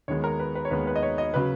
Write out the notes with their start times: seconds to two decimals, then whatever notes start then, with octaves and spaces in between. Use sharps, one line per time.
0.08 D#2 D#3 G#3 B3 C#5
0.24 A#4
0.39 B4
0.55 B4
0.65 C#5
0.71 D#2 D#3 G#3 B3 B4
0.87 B4
0.96 D#5
1.03 C#5
1.18 D#5
1.34 C#3 F#3 B4